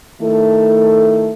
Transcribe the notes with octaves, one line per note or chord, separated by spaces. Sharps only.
D#3 A3 E4 A4